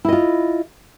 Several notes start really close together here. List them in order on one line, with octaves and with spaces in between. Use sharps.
E4 D#5 F4